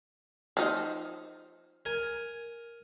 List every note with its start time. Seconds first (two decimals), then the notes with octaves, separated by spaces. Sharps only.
0.57 F3 D#4
1.86 A#4 G#5